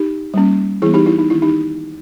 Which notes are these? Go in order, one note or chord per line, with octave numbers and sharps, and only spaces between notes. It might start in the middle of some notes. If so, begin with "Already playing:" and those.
Already playing: D#4 G4
G3 A#3 C#4
E3 G3 B3 E4 G#4
D#4 G4
E4
D#4
D#3 A#3 C#4 E4
D#4 G4